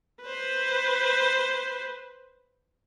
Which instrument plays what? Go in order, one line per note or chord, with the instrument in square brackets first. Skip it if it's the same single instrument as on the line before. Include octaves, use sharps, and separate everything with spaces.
[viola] B4 C5